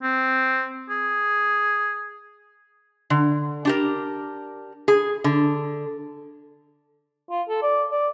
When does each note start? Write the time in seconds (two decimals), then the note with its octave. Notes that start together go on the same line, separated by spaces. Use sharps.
0.03 C4
0.90 G#4
3.10 D3
3.65 D4 G4 A#4
4.88 G#4
5.24 D3
7.30 F4
7.49 A4
7.62 D5
7.92 D5